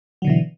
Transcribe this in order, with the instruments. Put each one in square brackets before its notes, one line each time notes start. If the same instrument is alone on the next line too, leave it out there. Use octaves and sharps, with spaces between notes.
[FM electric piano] F#3
D3
B2
E3